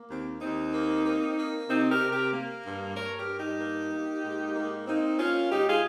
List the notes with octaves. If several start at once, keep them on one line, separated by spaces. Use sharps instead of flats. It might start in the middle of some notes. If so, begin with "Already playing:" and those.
Already playing: A#3
D#2 C4
D#2 C4 D#4
A#3
A#3
A#3
C3 C4 D#4
G4 A#4
C3
G4 A#4
A#3
G2
G2 A#4 C#5
G4 A#4
G2
D#4 G4
A#3
A#3
G#2
A#3
A#3 C4 D#4
A#3 C#4 F4
G#2 D#4 G4
F4 G#4